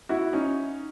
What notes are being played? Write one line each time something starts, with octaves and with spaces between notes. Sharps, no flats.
E4 F#4
C#4 D#4